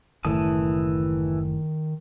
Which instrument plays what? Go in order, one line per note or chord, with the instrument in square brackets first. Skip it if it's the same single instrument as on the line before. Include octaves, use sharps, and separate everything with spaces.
[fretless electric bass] F#1 A2 [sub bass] D#3 [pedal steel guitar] E3 A5 D#6